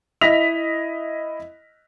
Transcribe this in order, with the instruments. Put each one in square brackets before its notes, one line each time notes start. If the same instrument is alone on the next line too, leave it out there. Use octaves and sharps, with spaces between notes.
[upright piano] E4 D#5 A#6 B6 F7